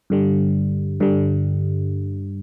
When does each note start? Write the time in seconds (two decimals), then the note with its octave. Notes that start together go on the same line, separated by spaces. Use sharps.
0.10 G2 D3 G3
1.00 G2 D3 G3